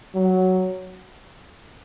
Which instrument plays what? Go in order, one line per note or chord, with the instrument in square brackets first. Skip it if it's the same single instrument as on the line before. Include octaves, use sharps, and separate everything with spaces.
[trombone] F#3